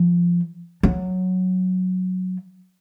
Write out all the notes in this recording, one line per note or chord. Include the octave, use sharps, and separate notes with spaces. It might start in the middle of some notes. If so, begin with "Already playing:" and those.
Already playing: F3
F#3